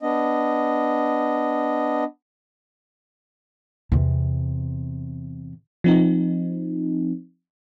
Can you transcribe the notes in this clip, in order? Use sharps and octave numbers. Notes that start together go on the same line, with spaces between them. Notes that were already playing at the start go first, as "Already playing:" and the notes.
B3 D4 D#5
E2 C3
F3 C4 D#4